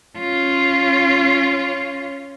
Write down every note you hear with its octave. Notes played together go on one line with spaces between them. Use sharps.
C#4 F4